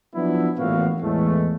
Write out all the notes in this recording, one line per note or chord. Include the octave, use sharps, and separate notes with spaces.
F3 F#3 B3 D4 E4
A1 A#2 E3 B3 F#4 F5
E2 A2 G#3 A3